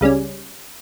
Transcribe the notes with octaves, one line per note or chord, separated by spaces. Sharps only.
C#2 C#3 G3 C#4